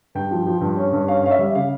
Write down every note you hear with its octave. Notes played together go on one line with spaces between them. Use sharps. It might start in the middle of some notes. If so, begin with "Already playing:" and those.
G2 G5
F3
F3
G2
C#4
G2
C#4 F5
C#4 F5
E5
G3
C#3 F5